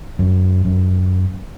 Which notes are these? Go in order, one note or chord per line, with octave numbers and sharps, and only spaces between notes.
F#2
F#2